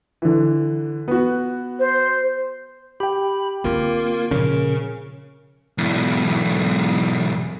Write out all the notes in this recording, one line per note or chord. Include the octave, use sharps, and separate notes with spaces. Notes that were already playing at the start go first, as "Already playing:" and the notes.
D3 E3
B3 F#4
C5
G4 G5 B5
D3 A#3 C4 F4 A#4
A#2 C#3 F3 A#4
B1 E2